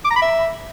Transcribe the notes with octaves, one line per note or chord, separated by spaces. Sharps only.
D6
A#5
B5
E5